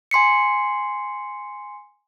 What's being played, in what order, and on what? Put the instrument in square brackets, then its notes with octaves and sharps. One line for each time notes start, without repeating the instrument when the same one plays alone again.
[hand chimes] G#5 C6 C7 C#7